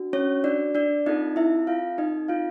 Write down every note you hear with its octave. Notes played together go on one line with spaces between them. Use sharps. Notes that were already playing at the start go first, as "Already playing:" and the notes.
Already playing: D4 F#4
C#4 C#5
D4 D5
D4 D5
C4 D#4 F4 A4 D#5
E4 E5
F4 F5
D#4 D#5
F4 F5